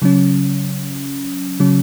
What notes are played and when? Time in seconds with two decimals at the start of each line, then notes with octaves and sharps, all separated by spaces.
0.02 C#3 F#3 C#4
1.60 C#3 F#3 C#4